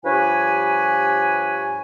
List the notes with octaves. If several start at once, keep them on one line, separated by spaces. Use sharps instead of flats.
G2 F3 G4 B4 C#5 G#5